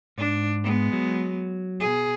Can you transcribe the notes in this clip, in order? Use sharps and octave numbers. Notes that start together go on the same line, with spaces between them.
G#2 D4
G#3 B3
F#3
B2 G#4